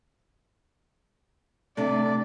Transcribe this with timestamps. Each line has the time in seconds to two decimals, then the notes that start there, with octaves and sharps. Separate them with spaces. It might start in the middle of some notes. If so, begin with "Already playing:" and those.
1.77 C3 A3 D4 D5